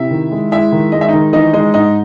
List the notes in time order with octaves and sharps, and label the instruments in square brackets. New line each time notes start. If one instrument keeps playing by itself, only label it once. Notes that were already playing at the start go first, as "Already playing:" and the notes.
Already playing: [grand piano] C3 [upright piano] E4 E5
[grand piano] D#3
G#3
[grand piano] G#3 [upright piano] E4 E5
[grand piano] D#3
[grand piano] G#3 [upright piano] D#5
[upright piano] E5
[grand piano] D#3 [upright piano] D#4 D#5
[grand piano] E3 [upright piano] D#4 D#5
[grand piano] G#3 [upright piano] D#4 D#5
[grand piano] G#2 [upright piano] D#4 D#5